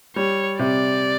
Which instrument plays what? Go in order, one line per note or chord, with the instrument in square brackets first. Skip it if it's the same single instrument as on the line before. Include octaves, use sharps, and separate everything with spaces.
[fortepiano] G3 [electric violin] C#5
[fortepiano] C3 [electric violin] D5